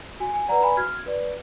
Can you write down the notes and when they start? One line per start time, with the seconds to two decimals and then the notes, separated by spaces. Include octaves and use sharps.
0.20 F#4 G#5
0.34 G#5
0.49 B4 D5 F#5 A#5
0.63 G#5 B5
0.77 F#4 F6 G#6
1.06 B4 D5